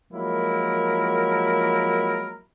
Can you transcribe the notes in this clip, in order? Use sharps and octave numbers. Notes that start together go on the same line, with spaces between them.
F3 F#3 G#3 A#3 E4 A#4